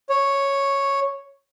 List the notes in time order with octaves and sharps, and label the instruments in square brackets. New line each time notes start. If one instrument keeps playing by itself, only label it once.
[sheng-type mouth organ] C#5